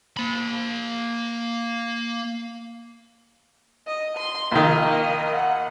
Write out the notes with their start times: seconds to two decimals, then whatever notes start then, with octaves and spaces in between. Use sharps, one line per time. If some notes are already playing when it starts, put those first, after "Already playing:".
0.17 A#3 B5
3.87 D#5
4.17 C6
4.52 A#1 D#3 A#3 D#5
5.35 F#5